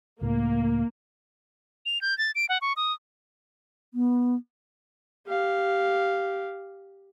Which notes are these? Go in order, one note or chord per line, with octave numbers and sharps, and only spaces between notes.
C#2 A2 A#3
F7
G6
A6
D7
F#5
C#6
D#6
B3
G4 F5